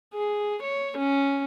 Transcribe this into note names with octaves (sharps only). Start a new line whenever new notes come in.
G#4
C#5
C#4